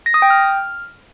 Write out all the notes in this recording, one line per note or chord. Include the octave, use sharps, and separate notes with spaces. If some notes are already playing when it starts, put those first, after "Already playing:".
A#6
D#6
G5
F6